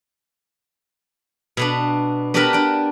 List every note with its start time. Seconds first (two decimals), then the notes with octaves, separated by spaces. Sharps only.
1.57 B2 B3 D4
2.34 B3 D4 F#4 G4 A#4 B5
2.53 D4 G5